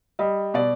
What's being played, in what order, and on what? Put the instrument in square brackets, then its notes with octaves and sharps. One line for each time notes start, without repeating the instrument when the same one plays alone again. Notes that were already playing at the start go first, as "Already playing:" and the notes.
[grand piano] G3 [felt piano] D#5
[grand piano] B2 [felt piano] D5